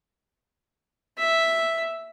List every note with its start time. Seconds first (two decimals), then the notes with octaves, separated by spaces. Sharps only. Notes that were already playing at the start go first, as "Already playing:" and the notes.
1.18 E5